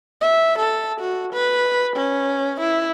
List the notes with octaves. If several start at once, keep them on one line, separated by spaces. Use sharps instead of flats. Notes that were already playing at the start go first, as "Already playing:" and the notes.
E5
A4
F#4
B4
C#4
E4